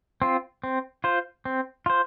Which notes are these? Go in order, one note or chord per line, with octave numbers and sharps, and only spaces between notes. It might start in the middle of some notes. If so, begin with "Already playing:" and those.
C4 F4
C4
F4 C5
C4
F4 C5